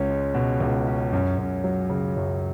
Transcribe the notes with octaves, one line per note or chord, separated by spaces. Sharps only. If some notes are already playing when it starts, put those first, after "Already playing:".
Already playing: C#2 C#4
G#3
B2
C#2
C#4
F#2
F#2
F#3
C#3
F#2